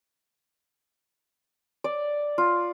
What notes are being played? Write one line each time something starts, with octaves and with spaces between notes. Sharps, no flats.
D5
F4